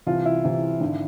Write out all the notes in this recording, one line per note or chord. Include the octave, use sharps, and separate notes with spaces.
C2 C3 E3 F4
E4
C2 C3 E3
G#1 D3